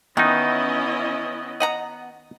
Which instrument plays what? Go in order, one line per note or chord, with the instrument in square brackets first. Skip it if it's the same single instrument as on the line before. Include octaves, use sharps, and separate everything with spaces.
[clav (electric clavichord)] D#3 D#4 [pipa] E3 [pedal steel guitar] B3 [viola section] C#4 E4 D#5
[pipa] D#5 F#5 A#5